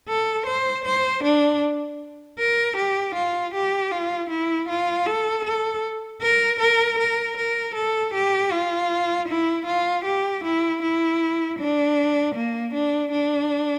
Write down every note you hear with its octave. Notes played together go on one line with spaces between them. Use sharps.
A4
C5
C5
D4
A#4
G4
F4
G4
F4
E4
F4
A4
A4
A#4
A#4
A#4
A#4
A4
G4
F4
E4
F4
G4
E4
E4
D4
A#3
D4
D4